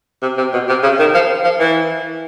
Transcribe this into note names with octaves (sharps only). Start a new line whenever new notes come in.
C3
C3
B2
C3
C#3
D#3
F3
F3
E3